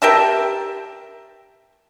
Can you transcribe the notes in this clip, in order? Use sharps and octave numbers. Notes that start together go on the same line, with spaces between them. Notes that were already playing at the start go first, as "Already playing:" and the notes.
G4 A#4 E5 A5